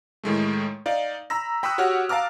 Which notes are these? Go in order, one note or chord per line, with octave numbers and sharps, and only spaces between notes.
A2 D#3 G#3 A3
D#4 D5 F5
A#5 B5 E6 A#6
G5 B5 C#6 D#6 E6 F#6
F#4 G4 C#5 F#5 F6
F5 A5 A#5 D6 F6